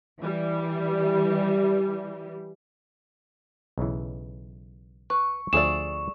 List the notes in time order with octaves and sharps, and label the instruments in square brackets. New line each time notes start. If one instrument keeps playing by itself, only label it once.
[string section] E3 G3
[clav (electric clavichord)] B1 C#3 E3
[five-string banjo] B4 [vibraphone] C#6
[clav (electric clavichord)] D2 F3 E5 [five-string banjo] G#4 A4 D5 [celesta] E7